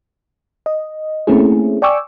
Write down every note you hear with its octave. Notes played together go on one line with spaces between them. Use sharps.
D#5
A3 A#3 C4 C#4 E4 G#4
D5 G5 G#5 C#6 D6 E6